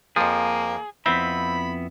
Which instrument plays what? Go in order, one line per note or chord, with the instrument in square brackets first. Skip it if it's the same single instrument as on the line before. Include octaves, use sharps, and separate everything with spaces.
[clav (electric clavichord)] F2 F3 [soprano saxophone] A#3 [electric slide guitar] G#4
[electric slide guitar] F2 B3 E4 [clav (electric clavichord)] C4 [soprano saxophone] B5